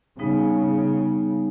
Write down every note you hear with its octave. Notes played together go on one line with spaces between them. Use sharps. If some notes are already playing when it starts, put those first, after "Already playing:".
C#3 G3 B3 D#4